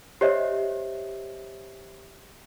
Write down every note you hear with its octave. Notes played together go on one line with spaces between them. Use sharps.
G4 C5 C#5 D#5 E5